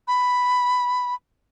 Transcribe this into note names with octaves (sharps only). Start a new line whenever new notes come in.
B5